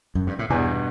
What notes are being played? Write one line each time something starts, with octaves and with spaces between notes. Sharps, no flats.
F#2
G2
A2
E2 G2 B2